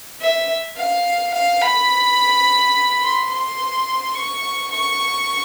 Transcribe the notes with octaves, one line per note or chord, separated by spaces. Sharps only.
E5
F5
F5
B5
C6
C6
C#6
C#6